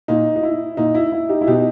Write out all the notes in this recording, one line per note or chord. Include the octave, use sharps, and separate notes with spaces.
A#2 D#4
D#4
E4
A#2 D#4
E4
E4
D#4 G4
E4
B2 D#4 G4